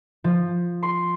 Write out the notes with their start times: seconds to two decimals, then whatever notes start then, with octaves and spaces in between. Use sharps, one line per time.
0.24 F3
0.83 C6